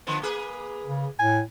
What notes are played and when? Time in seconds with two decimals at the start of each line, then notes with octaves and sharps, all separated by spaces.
0.07 D3 F3 B3
0.22 A#3 G#4 B4
0.86 C#3
1.19 A2 G#5